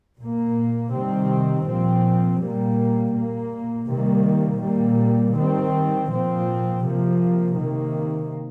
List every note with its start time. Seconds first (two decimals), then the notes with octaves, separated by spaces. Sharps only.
0.18 A#2 A#3
0.92 C3 D#3 G3 C4
1.66 A#2 F3 C4
2.40 A#2 G3 A#3
3.14 A#2 A#3
3.88 C3 D#3 G3 A#3
4.61 A#2 G3 A#3
5.35 D#3 G3 C4
6.10 A#2 F3 C4
6.84 C3 F3 A#3
7.58 C3 D#3 A#3